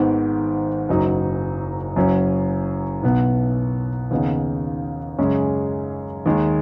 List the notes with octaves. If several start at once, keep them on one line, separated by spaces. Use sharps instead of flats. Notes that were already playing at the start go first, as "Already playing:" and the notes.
Already playing: G#1 G#2 D#3 B3
F#1 F#2 F#3 D#4
F#1 F#2 F#3 C#4
B1 B2 B3
D#2 C#3 B3 D#4
F#2 C#3 G#3 C#4
D#2 D#3 G#3